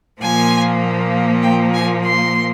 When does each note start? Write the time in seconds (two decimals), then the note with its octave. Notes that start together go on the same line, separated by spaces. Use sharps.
0.21 A#2 F3 A#3 G#5
1.42 G5
1.74 G#5
2.04 C6